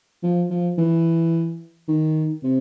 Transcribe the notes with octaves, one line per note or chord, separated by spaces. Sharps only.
F3
F3
E3
D#3
C3